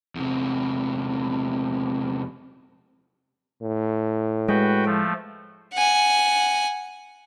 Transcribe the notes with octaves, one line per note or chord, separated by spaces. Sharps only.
E2 C3
A2
G#3 F#4 B4 G5
F3 A3
F#5 G#5